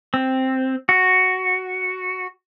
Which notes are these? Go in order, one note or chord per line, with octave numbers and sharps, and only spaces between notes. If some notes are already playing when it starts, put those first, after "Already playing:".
C4
F#4